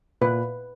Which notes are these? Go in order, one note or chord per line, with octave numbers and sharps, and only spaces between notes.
A#2 B4